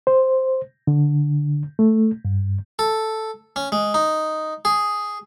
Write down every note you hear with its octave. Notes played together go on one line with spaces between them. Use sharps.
C5
D3
A3
G2
A4
C#4
G#3
D#4
G#4